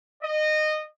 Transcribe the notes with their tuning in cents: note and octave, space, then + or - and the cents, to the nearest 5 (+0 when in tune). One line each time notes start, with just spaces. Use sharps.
D#5 -20